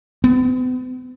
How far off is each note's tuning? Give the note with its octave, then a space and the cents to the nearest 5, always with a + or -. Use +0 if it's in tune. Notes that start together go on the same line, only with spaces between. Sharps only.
B3 +45